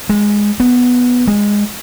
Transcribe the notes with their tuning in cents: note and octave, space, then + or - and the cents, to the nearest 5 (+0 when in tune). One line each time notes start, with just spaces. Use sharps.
G#3 -5
B3 +0
G#3 -15